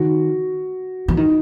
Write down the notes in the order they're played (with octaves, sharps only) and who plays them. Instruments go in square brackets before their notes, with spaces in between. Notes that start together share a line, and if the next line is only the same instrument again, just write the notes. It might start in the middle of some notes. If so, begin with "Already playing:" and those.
Already playing: [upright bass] D#3 [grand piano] F#4
[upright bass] E3
[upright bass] D#3 [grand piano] D#4